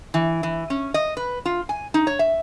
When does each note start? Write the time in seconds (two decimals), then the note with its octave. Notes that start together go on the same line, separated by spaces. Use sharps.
0.14 E3
0.43 E3
0.70 C#4
0.94 D#5
1.17 B4
1.45 F4
1.69 G#5
1.94 D#4
2.07 C#5
2.19 E5